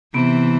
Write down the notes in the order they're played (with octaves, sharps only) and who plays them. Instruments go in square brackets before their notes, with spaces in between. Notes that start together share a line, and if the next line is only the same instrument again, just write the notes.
[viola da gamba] C3 E3 [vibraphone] B3